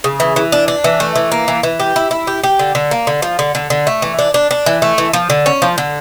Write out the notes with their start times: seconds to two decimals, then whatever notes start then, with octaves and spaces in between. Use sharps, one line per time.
0.04 C#3
0.20 E3
0.36 E3
0.52 D4
0.68 D4
0.84 E3
1.00 A3
1.16 E3
1.32 A#3
1.48 E3
1.63 E3
1.80 G4
1.96 E4
2.11 E4
2.27 G4
2.43 G4
2.59 D3
2.75 D3
2.91 A#3
3.07 D3
3.22 F3
3.39 D3
3.55 D3
3.70 D3
3.87 A3
4.02 E3
4.19 D4
4.34 D4
4.51 D4
4.66 E3
4.82 A3
4.98 E3
5.13 F3
5.30 D3
5.46 C#4
5.62 F3
5.78 D3